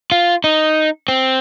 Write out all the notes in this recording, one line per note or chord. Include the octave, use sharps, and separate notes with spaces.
F4
D#4
C4